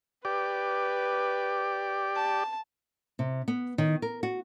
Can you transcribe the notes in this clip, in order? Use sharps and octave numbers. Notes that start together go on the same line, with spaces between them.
G4 B4 D5
A5
C3
B3
D#3
A#4
F#4